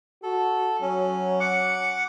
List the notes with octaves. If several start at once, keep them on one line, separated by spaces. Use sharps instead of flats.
F#4 A4
F#3 C#4
F#5 D6 C#7